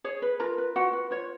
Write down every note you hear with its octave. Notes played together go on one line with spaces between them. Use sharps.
G#4 C#5
B4
F4 A#4 A#5
B4
F4 F#4 F#5
B4
F4 C#5